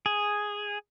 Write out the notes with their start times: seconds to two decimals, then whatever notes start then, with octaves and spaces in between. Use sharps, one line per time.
0.06 G#4